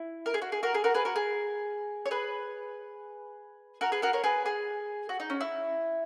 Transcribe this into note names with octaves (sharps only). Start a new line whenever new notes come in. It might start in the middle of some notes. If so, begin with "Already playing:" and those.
Already playing: E4
A#4
G#4
F#4
G#4
F#4 A#4
G#4
F#4 A#4
G#4 B4
F#4 A#4
G#4
C#5
G#4 B4
F#4 A#4
G#4 B4
F#4 A#4
A#4 C#5
G#4 B4
G#4
F#4
D#4
C#4
E4